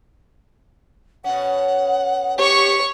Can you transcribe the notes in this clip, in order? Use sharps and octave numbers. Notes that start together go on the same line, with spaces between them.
B2 C#4 F#5
G4 C#5 C#6